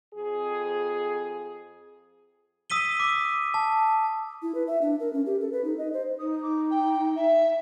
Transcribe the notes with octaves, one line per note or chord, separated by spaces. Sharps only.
F2 G#4
D#6 E6 B6 D#7 G7
D6
A5
E4
B4
E5
D4
A#4
C#4
G4
A4
B4
D#4
D#5
C5
D#4 D#6
D6
G5
E5